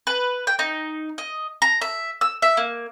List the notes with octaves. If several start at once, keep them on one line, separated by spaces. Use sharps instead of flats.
B4
G5
D#4
D#5
A#5
E5
E6
E5
A#3